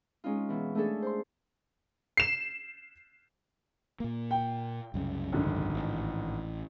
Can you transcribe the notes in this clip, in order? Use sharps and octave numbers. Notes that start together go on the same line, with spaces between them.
G#3 C#4 D#4 F4
B2 E3
A3 C#4 D4 G#4 A4
C5 C6
C7 E7
A#2 A#3
G5
C2 F#2 C#3
G#1 D3
A1